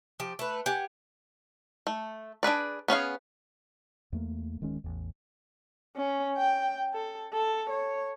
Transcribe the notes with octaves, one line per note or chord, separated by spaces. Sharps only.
F3 G4
A3 B4
G4 F#5 G#5
A3
D4 G#4 B4 D5
B3 C#4 G#4 F5
E2 A3 A#3
D1 D#3 G#3 C#4
A1 E2
C#4
G5
A4
A4
C#5